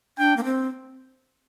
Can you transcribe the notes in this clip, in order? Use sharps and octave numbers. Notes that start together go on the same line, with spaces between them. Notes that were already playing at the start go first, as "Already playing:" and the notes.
D4 G5
A#3
C4